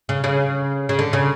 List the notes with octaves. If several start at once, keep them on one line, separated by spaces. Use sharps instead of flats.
C#3
C#3
C#3
D3
C#3